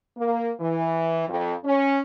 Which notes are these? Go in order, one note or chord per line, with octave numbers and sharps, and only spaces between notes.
A#3
E3
F2
C#4